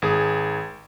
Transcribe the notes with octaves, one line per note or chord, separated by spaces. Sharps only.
G#1 G#4